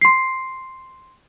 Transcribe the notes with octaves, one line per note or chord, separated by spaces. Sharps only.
C6 C7